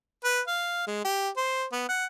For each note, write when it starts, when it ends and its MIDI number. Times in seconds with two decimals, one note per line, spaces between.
0.24 0.41 71
0.47 0.85 77
0.87 1.03 56
1.04 1.29 67
1.37 1.65 72
1.72 1.84 59
1.89 2.05 78